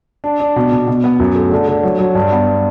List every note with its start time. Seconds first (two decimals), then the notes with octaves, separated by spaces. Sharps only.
0.24 D4
0.40 D4
0.56 B2
0.72 B2
0.87 B2
1.04 B3
1.20 F#2
1.36 A3
1.51 D3
1.68 D3
1.83 F#3
1.99 F#3
2.15 G2
2.31 B3